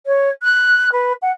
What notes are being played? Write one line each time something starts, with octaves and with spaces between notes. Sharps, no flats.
C#5
F#6
B4
F#5